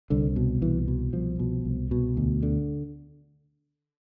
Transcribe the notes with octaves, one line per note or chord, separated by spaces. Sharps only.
C2 D3
B2
C2 E3
B2
C2 F3
B2
C2
B2
D2
D3